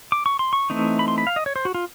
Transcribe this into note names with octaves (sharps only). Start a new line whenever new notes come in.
D6
C#6
C6
C#6
E3 A3 C4 D#4
B5
C6
B5
F5
D#5
C#5
C5
F#4
F4